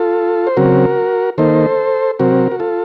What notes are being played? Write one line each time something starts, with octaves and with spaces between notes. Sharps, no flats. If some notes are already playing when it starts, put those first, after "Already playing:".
Already playing: F4 A4
C5
C#3 F#3 C4 F#4 A#4
D#3 A#3 D#4 A4 C5
C3 F#3 C4 F#4 A#4
F#4
F4 A4